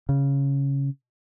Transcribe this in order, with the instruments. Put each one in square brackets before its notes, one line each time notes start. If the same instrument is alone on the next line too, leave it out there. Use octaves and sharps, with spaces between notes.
[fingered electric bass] C#3